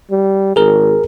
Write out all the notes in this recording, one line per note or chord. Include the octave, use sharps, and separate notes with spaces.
G3
G#1 G#4 A#4